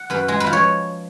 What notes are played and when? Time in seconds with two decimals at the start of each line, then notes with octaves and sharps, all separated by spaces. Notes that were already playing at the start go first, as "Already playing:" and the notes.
Already playing: F#5
0.10 F#2 B4
0.28 G#3
0.40 B4
0.47 F3
0.53 C#5